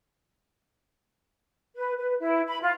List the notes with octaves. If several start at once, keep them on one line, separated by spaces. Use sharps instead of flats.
B4
B4
E4
B5
F4